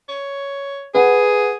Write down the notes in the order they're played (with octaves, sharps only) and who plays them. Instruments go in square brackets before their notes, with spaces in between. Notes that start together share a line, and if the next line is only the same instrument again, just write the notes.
[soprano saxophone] C#5
[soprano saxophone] G#4 [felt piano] B4 F#5